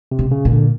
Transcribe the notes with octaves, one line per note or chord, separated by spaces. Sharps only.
C3
B2
C#3
A#2
D3